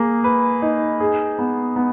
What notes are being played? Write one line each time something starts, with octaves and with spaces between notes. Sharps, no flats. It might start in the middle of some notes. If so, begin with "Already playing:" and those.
Already playing: A#3 G#4
B4
D#4
G#4
B3
B3